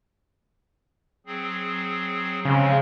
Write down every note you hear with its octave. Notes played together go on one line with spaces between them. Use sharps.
F#3 C4 G#4
C#3 F3 G#3 C4